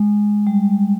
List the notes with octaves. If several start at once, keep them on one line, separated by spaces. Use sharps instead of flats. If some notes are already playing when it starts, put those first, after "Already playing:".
Already playing: G#3
G3